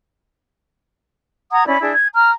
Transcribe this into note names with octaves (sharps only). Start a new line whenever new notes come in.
F#5 A#5 D#6 G#6
C#4 E4 D5 B5
D4 E4 G#4
G#6
A#5 F6